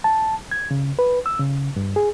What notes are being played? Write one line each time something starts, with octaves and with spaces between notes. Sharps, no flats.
A5
G#6
C#3
B4
E6
C#3
G2
G#4